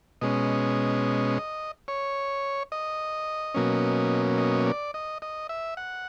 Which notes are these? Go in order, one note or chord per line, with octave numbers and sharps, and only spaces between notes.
B2 G#3 C#4 D#5
C#5
D#5
B2 F#3 A#3 C#4
D#5
D5
D#5
D#5
E5
F#5